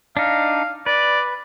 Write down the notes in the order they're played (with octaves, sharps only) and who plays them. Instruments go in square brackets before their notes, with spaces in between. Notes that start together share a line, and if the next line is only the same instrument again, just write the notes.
[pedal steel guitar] D4 D#4 [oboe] F5
[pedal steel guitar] B4 [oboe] D5